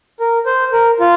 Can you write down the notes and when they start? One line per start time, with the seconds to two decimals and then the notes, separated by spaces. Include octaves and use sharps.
0.20 A#4
0.46 C5
0.73 A#4
1.00 F4